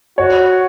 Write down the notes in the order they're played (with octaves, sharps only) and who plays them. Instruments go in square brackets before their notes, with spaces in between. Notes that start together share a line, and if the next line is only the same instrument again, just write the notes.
[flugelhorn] F#4 [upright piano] C#5